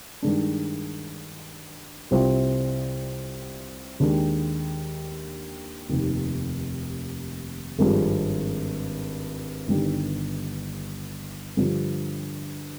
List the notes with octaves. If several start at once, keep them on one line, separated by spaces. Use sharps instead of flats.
G2 D#3 G#3 D4
C2 C3 G3 C4 F4
D#2 D#3 G#3 D4
F1 D#2 D#3
G#1 G2 F3 G#3
G1 G2 D#3 G3 D4
G2 D3 F3